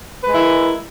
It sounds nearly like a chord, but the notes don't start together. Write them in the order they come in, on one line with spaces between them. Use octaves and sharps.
B4 G#3 A#4 E4